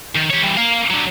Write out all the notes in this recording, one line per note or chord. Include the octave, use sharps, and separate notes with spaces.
D#3
G4 C#5
E3 G3
A#3 F5
F#3 D4